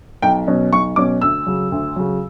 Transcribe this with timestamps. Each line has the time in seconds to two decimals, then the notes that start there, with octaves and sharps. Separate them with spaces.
0.22 B1 G5
0.47 B2 F#3 C#4
0.73 B1 C#6
0.96 B2 F#3 C#4 D6
1.22 D2 E6
1.47 C#3 F#3
1.72 D2
1.96 C#3 F#3